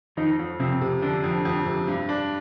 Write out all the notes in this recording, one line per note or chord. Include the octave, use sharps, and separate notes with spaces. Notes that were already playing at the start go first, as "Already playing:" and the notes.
F2 D#3 D#4
F2
F2 C3 C4
C3
D3 F3 D4
F2
F2
C3
G2
D4